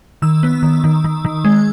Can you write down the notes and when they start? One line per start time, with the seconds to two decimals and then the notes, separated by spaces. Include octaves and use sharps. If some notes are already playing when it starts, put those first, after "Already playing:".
0.22 D#3 E6
0.43 B3
0.63 D#3
0.84 D#3
1.04 D#3
1.25 D#3
1.45 G#3